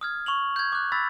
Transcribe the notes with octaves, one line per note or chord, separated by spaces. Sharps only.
D#6 F6 G#6
C#6 F7 F#7
G6 G#6
D6 F#6
B5 E6 A6 B6